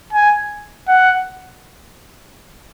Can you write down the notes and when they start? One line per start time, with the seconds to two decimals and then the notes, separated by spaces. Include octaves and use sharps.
0.13 G#5
0.88 F#5